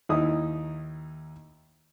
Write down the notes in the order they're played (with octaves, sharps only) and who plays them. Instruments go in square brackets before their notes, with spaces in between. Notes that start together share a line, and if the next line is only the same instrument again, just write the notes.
[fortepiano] D#2 D#4 E4 D#6